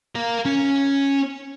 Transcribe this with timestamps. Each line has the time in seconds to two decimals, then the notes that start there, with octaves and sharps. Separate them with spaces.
0.15 A#4 F5
0.45 C#4